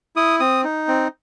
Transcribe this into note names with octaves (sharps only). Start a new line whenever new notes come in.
E4 D#6
C4 D#6
D#4
C4